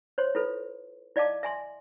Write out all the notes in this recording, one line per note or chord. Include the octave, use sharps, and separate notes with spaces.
C5 C#5 C6
E4 F4 A4 B4
E4 D5 D#5 F5 A5 D6
E5 G#5 C6